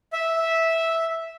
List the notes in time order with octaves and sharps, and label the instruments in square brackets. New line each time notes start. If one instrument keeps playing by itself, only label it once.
[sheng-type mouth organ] E5